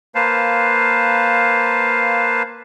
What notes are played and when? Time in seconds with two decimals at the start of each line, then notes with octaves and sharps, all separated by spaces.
0.15 A#3 B4 C5 F5 A5